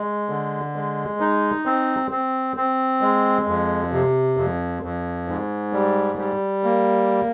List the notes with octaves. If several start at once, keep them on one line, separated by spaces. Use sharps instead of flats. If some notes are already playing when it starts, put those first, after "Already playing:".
Already playing: G#3
D3
G#3
D#4
C4
C4
C4
G#3
F2
C3
F2
F2
G#2
G3
G3
A#3